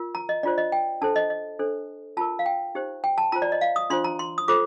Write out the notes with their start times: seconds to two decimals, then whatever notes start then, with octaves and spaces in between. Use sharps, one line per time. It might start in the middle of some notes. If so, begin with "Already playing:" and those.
Already playing: F4 A#4
0.15 A#5
0.29 D#5
0.43 D4 F4 C5 D5
0.58 D#5
0.72 G5
1.01 D4 A4 C5 A5
1.16 D#5
1.30 D#5
1.59 D4 A4 C5
2.17 F4 A#4 A5
2.39 F5
2.46 G5
2.75 D#4 G4 C5
3.04 G5
3.18 A5
3.32 F4 C5 A#5
3.42 D5
3.52 D#5
3.61 F5
3.76 D#6
3.90 D4 F4 C5 C6
4.04 A#5
4.19 C6
4.38 D#6
4.48 F4 A4 C5 D6